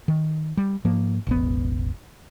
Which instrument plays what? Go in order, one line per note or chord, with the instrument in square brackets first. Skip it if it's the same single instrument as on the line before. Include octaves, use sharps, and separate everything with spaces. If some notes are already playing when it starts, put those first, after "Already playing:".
[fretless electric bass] D#3
G3
G#2 F3 A#3
E1 A1 B3